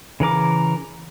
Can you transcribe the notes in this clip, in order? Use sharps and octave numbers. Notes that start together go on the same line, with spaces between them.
C#3 E3 A#4 D6